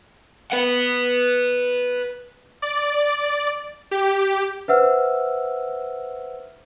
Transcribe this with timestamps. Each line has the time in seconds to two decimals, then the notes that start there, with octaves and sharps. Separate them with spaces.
0.52 B4 F#5
2.62 D5
3.91 G4
4.68 B4 C5 E5 F#5 E6 F6